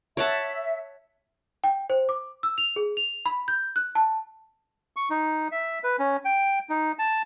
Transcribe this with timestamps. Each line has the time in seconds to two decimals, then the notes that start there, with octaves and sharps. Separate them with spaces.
0.17 C#5 E5 F#5 A5
1.64 G5
1.90 C5
2.09 D6
2.43 E6
2.58 F7
2.76 G#4
2.97 F7
3.26 B5
3.48 G6
3.76 F#6
3.95 A5
4.96 C#6
5.10 D#4
5.52 E5
5.84 B4
5.99 C#4
6.25 G5
6.70 D#4
6.99 A5